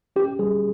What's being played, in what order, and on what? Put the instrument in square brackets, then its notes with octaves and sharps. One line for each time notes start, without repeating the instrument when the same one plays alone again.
[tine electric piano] C#4 G4
G3 G#4